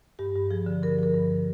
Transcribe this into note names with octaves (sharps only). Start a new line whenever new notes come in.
G2 G4
G2
F3 G#4
D3
G2 A#4
F3 A#4
G2